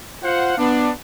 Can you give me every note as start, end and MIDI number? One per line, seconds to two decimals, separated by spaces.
0.23 0.57 65
0.23 0.57 72
0.23 0.57 77
0.23 0.57 78
0.58 0.90 59
0.58 0.90 62